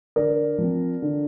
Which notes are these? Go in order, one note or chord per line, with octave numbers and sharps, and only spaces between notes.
D3 A#4 D5
F3 C4
D3